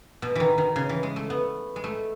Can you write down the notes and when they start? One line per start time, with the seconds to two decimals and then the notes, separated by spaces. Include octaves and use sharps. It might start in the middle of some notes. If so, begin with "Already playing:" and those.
0.22 B2
0.35 D#3 E3
0.58 D#3
0.76 C#3
0.89 E3
1.03 G#3
1.16 A3
1.30 B3
1.76 G#3
1.84 A3